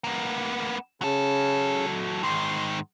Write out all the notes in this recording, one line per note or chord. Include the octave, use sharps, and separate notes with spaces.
A#3 B3
C#3 F#3 A4
G#2 D#3 C6